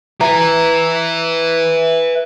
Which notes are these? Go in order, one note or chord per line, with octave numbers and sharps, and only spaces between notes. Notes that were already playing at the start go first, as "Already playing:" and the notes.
B4 E5 A#5